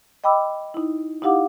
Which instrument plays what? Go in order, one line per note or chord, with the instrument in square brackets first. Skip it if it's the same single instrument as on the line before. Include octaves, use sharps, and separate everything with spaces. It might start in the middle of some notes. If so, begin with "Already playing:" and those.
[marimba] D#5 G5 B5 D6 E6
D#4 E4
D#4 E4 G4 F5 F#5 D6